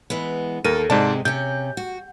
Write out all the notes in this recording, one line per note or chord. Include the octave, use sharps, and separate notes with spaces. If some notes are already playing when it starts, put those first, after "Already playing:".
E3 G#3 B3
D#2 A4 A#4 D#7
G#2 C3 G#3 C4 D5 A5
C3 C#4 G6
F#4